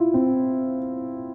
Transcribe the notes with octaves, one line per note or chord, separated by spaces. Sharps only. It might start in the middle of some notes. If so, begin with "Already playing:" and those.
Already playing: E4 F4
C4